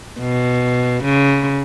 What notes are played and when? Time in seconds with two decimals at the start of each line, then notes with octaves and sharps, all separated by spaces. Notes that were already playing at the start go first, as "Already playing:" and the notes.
0.20 B2
1.04 C#3